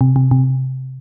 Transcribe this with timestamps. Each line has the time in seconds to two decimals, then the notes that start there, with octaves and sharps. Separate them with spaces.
0.01 C3
0.16 C3
0.31 C3